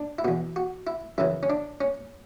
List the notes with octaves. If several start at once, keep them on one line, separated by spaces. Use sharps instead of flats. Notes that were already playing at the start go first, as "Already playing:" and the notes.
Already playing: D4
E4
E2 B2 F#4
F#4
E4
F#2 C#3 E3 E4
C#4
D4
C#4